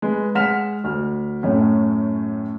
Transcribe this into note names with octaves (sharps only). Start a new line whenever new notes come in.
G#3 B4
G#3 F#5 F6 B6 E7
D2 F6
F#2 A2 A3 C#4